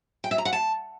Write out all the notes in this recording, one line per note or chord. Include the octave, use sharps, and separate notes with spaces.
G5
E5
A#5
F#5
A5